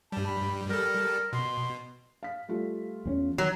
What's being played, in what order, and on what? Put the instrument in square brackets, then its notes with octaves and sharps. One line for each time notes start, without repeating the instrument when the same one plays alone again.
[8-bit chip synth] G2 G3 [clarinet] A5
[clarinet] B5
[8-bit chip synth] G3 A4 [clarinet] A#4
[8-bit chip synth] B2 [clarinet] C6
[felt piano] F5 B6
G3 A3 F4
[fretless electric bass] E2 C4 C#4
[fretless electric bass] D#3 [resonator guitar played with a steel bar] F#3